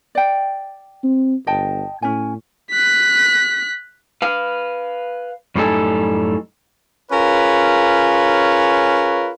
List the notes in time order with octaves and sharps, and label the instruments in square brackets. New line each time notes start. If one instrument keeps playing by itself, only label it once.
[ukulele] D5 G5
[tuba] C4
[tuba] G1 [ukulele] D#5 G5 A5
[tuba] A2 [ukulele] C#4 G#5
[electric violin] F#6 B6
[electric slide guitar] B4 F5
F#2 A2 G3 D#4 A4 G#5
[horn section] C#4 F4 G#4 A#4 B4 C#5